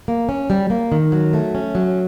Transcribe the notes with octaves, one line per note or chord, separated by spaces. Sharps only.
A#3
C#4
G3
A#3
D#3
F#3
A3
C#4
F#3